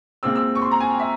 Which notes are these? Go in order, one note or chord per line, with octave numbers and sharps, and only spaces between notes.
A#2 G#3 C4 E6
E6
C#6
C6
A#5
G#5
G5
E5